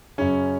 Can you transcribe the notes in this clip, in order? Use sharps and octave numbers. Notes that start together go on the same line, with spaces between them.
F#2 C#3 C#4 C#5